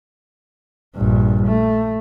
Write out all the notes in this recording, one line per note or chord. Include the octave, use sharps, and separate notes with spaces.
A#1 G2
A3